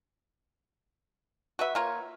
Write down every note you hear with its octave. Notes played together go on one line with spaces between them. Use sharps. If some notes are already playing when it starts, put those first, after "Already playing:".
F#4 B4 E5
A#3 F4 C#5